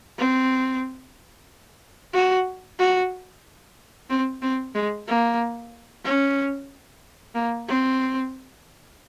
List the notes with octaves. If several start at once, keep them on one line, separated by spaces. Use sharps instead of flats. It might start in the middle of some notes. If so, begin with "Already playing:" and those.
C4
F#4
F#4
C4
C4
G#3
A#3
C#4
A#3
C4